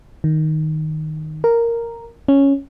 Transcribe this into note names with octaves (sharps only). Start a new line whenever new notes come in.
D#3
A#4
C#4